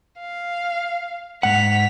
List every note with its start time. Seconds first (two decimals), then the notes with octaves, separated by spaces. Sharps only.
0.19 F5
1.43 G#2 F#5 B6 F7